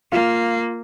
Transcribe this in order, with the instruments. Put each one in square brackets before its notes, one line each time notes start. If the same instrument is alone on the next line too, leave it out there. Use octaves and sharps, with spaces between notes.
[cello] A#3 [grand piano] F4